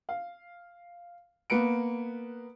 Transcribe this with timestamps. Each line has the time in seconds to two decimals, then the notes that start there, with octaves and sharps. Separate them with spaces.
0.09 F5
1.50 A#3 B3 B4 C#7 D7